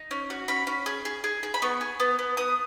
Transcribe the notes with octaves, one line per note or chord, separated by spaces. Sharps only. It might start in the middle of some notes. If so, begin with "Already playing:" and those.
Already playing: D#4
C#4
F#4
C#4 B5
C#4
G#4
G#4
G#4
G#4
B5
B3 C#6
G#4
B3
B3
B3 D#6